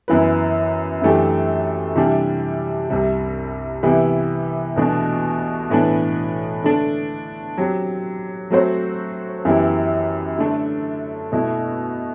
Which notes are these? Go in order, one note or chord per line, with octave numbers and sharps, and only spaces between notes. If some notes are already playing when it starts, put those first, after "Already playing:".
F#2 E3 B3 E4 B4
F#2 E3 A3 D4 G4
C3 E3 G3 D4 G4
C2 C3 G3
C3 E3 B3 E4 G4
E2 B2 A3 D4 F#4
A2 E3 B3 D4
D3 A3 D4
F#3 C4 G4
F#3 A3 C4 F#4 C5
F#2 E3 B3 E4 G4
D3 A3 D4
B2 A3 E4